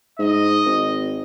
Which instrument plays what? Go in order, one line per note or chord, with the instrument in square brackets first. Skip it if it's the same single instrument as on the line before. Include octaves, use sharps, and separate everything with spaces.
[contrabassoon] G#2 [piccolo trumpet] D#5
[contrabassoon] G#1